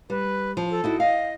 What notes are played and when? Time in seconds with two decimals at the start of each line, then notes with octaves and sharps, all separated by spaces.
0.10 G3 B4
0.57 F3
0.71 A4
0.84 D#4 E4 F#4
1.00 D#5 F5